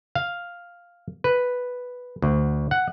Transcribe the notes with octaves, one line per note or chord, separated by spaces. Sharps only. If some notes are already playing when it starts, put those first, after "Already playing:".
F5
B4
D2
F#5